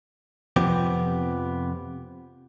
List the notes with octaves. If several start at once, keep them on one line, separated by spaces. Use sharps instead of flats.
F2 C3 F3 B3 G4